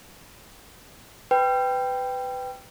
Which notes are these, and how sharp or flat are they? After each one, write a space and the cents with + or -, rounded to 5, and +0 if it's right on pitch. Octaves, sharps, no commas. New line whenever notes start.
B4 +20 G5 +0